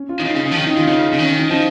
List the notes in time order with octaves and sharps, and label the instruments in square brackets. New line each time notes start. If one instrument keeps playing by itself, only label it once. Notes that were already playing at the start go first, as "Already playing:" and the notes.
Already playing: [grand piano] C#4
F4
[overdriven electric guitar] D#3
[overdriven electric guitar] C#3 [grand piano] D#4
[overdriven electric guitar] C#3
C#3
F3
[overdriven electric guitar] D#3 [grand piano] C#4
[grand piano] D#4
[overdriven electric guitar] D#3 [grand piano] F4
[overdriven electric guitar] C#3 [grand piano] D#4
[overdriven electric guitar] C#3
[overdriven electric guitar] D#3 [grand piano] C#4
[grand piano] C#4
D#4
[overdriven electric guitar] F3 [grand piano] D#4